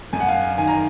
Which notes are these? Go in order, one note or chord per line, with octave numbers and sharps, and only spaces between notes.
F#2 G#5
F#5
F5 G#5
D#3 G#5
A#5